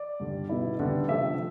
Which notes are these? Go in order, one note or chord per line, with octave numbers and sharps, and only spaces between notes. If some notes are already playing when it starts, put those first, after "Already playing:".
Already playing: D5
G2 D3 G3
B2 B3 E4
D3 G3 B3
C3 F3 A3 D4 E5